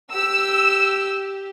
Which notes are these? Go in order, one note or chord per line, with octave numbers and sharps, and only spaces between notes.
G4 E6